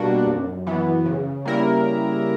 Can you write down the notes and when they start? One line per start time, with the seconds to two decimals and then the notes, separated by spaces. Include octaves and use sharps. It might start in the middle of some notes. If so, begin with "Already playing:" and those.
Already playing: B2 G3 A#3 D4 F#4
0.26 F#2
0.67 E3 B3
1.05 C#3
1.45 G3 A#3 E4 A#4